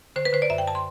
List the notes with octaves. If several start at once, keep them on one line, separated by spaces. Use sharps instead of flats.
D3 C5
B4
D3 C5
D5
F#2 E5
G5
A5
C6